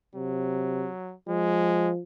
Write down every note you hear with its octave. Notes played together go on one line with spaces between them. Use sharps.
C3 F#3
F3 G#3